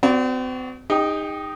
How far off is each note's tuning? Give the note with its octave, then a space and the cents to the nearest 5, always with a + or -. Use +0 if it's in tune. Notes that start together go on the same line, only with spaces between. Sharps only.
C4 -40 F#4 +0 D5 -20
D#4 +0 G#4 -45 G5 +0